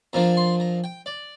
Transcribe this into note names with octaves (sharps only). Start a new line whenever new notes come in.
A#2 F3 A#3 D4 A#5
C6
A#5
G5
D5